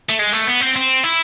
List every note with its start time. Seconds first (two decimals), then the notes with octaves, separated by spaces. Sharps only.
0.10 A3
0.19 G#3
0.33 A3
0.47 B3
0.61 C4
0.76 C4
1.04 E4